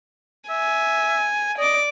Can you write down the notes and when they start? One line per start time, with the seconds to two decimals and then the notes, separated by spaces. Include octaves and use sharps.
0.50 E5 G#5
1.59 D5 D#5 D6